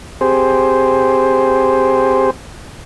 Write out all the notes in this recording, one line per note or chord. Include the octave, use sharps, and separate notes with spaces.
C4 G4 G#4 C5